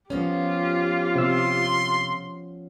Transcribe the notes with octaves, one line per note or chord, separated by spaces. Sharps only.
F3 B3 C#4 F4 G4
C3 C6 E6